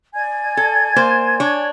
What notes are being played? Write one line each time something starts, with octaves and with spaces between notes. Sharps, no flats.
D5 G#5 G#6
A4
A#3 C5
D4 C#5